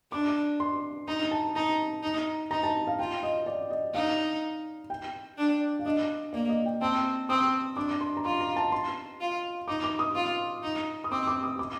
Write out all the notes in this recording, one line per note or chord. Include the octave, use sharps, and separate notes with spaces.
D4 D6
C6
D#4 A#5
A5
D#4 A#5
D#4
D#4 A#5
A5
F5
F4 G5
D#5
D5
D#5
D#4 F5
G5
D4
F5
D4 D#5
A#3 D5
D#5
G5
C4 A5
C4 D#6
D4 D6
C6
A#5
F4 C6
A#5
A5
C6
F4
D#4 D6
D6
D#6
F4
D#4
D#6
C4 D6
D6
D#6
D6